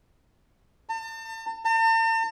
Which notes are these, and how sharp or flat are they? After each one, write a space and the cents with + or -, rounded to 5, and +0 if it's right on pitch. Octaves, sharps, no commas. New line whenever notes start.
A5 +40
A5 +45